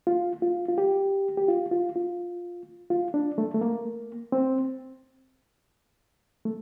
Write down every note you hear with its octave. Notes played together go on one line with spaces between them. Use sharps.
F4
F4
F4
G4
G4
F4
F4
F4
F4
D4
A3
A3
A#3
C4
A3